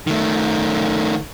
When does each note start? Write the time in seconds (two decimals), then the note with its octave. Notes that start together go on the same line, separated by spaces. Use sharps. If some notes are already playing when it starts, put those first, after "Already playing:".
0.07 D#3 A3